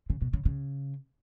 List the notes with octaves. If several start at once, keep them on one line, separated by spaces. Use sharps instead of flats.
C#3
B2
C#3
C#3